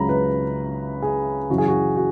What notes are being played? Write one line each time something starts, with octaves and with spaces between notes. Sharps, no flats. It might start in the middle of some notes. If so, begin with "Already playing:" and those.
Already playing: C#2 C#3 F#3 A#5 B5
B4
G#4
F#2 C#3 E3 F#4
G#4
F#4
F#4